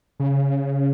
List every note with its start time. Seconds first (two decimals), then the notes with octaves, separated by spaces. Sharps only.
0.20 C#3